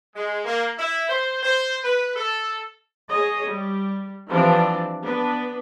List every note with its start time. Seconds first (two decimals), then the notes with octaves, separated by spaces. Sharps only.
0.16 G#3
0.45 A#3
0.78 E4
1.10 C5
1.43 C5
1.84 B4
2.16 A4
3.09 G#4 C#5 D#5
3.47 G3
4.28 E3 F3 C4 D4 G4 D5
5.02 B3 D4 B4